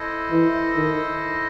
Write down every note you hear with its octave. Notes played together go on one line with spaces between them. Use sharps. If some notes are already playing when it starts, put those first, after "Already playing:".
Already playing: E4 A4 C5 D#5
E3
D#3